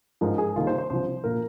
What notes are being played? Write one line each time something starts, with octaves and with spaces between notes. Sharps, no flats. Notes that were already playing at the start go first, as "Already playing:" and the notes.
G#2 F3 G#3 A#4
G#4
C2 C3 D#3 A#3 F4
C5
C5
C2 C3 F3 C5
A#2 F3 A#3 A#4